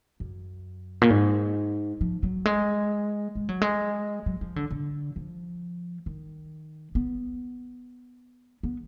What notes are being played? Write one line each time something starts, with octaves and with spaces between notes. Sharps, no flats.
F#2
A#2
G#2
F3
F#3
G#3
G#3
F#3
G#3
F#3
F3
D3
D3
F3
D#3
B3
B3